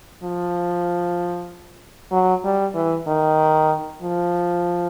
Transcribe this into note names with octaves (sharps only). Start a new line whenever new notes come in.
F3
F#3
G3
E3
D#3
F3